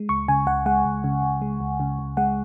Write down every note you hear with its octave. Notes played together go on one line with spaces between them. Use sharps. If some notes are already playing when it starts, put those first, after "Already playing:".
Already playing: G#3
C#2 C#6
C#3 G#5
C#2 F#5
G#3 F#5
C#2
C#3
C#2
G#3
C#2
C#3
C#2
G#3 F#5